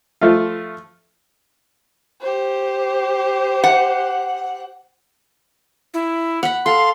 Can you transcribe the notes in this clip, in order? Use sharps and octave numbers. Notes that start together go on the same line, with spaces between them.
F3 A3 F4
G4 C5
F#5
E4
F#5 B5
A4 F5 C6